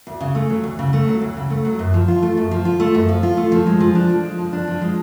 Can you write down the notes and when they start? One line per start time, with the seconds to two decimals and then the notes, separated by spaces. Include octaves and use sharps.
0.07 D2
0.21 C#3
0.35 A3
0.50 F#3
0.64 D2
0.79 C#3
0.93 A3
1.08 F#3
1.22 D2
1.37 C#3
1.50 A3
1.65 F#3
1.79 F#2
1.94 F3
2.08 F4
2.22 A3
2.37 F#2
2.51 F3
2.65 F4
2.80 A3
2.95 F#2
3.09 F3
3.23 F4
3.37 A3
3.52 F3
3.66 G#3
3.80 F3
3.95 D4
4.10 F3
4.24 G#3
4.38 F3
4.53 D4
4.68 F3
4.82 G#3